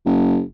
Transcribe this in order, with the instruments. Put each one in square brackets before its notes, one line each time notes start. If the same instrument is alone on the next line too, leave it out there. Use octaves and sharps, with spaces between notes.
[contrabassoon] F#1